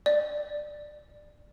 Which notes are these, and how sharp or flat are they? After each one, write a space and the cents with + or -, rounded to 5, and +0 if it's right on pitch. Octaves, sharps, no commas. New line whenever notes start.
D5 +15